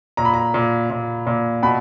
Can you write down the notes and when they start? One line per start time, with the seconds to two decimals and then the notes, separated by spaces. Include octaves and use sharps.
0.17 A#2 A#5
0.25 B5
0.34 A#5
0.54 A#2
0.90 A#2
1.27 A#2
1.63 B2 B5